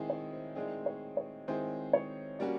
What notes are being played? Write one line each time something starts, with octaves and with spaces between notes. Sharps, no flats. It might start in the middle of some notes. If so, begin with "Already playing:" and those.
Already playing: D#3 G#3 C4 E4 G#4
C#5
C5
D#3 G#3 C4 E4 G#4 D5
C#5
C#5
D#3 G#3 C4 E4 G#4 C5
C#5
G3 A#3 C#4 F#4 D5